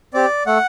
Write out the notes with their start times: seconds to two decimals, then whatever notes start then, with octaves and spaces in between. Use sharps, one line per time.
0.14 C4 G4 D5
0.46 A3 F#5